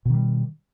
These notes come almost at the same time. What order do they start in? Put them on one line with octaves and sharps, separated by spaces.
B2 D#3 G3